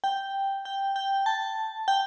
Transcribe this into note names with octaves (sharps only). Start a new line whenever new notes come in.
G5
G5
G5
A5
G5